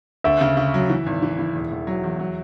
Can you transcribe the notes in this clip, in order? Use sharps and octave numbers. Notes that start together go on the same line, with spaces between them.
D2 E5
C#3
C#3
F#3
E3
G#1
E3
E3
E1
E1
F#3
E2
F#3